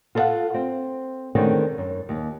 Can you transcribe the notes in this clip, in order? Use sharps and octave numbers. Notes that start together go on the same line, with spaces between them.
F4 A4 A#4 D#5 F5 F#5
C4
D3 D#3 G#3 A3 C4 C#4
F#2
D#2